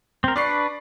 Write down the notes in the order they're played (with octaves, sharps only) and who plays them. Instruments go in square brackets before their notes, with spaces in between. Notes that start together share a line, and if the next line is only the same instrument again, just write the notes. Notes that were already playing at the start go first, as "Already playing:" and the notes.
[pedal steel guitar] C4 A#4
[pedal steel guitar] D4 B4 [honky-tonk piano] D5 C#6 C7